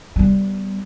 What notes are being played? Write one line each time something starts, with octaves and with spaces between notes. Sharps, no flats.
G3 B3